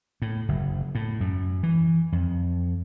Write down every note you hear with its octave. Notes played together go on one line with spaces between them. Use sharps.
A2
F#1
A2
F#2
E3
F2